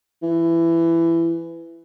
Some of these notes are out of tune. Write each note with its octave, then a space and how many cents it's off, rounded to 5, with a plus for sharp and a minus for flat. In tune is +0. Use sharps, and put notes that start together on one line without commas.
E3 +15